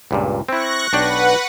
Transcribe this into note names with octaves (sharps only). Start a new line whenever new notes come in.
C#2 G2 A#2
C4 E4 C#6 F#6 A#6
B1 D4 B4 F#5 G5